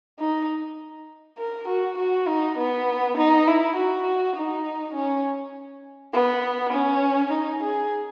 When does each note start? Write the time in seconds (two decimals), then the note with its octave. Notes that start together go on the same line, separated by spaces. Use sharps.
0.19 D#4
1.38 A#4
1.69 F#4
1.98 F#4
2.28 D#4
2.58 B3
3.18 D#4
3.47 E4
3.77 F#4
4.36 D#4
4.95 C#4
6.13 B3
6.73 C#4
7.32 D#4
7.63 G#4